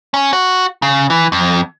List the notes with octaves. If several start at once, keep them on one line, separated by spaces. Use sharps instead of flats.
C#4
F#4
C#3
E3
F2